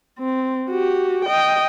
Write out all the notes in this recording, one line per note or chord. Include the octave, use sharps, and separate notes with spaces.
C4
F#4 G4
D#5 G5